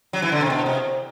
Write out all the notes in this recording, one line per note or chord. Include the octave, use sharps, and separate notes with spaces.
F#3
E3
D3
C3
B2
C3